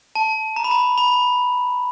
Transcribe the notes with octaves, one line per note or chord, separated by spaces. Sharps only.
A5
A#5
B5
A#5
B5